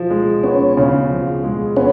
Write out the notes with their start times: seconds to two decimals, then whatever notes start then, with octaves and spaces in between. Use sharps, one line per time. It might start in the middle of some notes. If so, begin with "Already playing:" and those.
Already playing: F3
0.10 G#3
0.43 B3 C#4
0.77 C#3
1.10 F3
1.44 G#3
1.77 B3 C#4